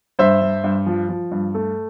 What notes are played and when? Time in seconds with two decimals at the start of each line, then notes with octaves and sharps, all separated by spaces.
0.19 G2 C5 E5
0.41 G2
0.64 G2
0.86 F3
1.09 F3
1.31 G2
1.54 A3